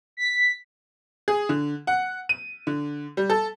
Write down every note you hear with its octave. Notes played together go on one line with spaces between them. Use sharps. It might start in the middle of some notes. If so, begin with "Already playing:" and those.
B6
G#4
D3
F#5
D#7
D3
G3
A4